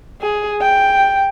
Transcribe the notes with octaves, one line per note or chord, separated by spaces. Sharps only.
G#4
G5